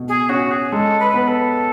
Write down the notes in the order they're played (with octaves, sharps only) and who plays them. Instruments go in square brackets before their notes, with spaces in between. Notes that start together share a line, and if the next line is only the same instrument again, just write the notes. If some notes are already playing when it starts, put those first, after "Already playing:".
Already playing: [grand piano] B2 A3
[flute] G#4
[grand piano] C#4 [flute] F#4
[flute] G#4
[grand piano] G#3 [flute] A4
[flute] B4
[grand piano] B3
[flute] A4